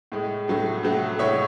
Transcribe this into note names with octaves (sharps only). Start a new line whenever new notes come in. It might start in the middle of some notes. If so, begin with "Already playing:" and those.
A2 G#3
A2 F#3 A3
A2 F#3 A3
A2 G#3 C#5 E5